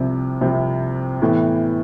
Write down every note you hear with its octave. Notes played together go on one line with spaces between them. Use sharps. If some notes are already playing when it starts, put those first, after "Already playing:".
Already playing: C2 C3 F3
C2 C3 F3
A2 E3 B3